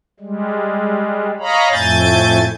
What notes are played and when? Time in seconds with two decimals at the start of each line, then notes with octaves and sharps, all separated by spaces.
0.20 G3 G#3
1.40 C#5 D#5 F5 A#5 B5
1.72 F2 A2 A3 G#5 G6 A6